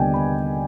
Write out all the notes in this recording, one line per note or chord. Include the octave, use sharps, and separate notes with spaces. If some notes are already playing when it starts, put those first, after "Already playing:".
Already playing: D#2 D3 G3 B3 D5 D#5 G5 G#5
B5